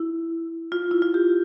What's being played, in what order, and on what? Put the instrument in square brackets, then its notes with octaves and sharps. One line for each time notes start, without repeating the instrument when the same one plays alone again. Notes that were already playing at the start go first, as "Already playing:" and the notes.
Already playing: [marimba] E4
F4
E4
F4
G4